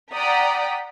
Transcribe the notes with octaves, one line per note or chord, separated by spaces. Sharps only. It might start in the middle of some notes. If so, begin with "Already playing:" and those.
D5 F#5 G5 A#5 D#6 B6